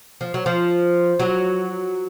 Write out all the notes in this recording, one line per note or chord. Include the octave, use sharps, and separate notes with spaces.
F3
F#3
F3
F#3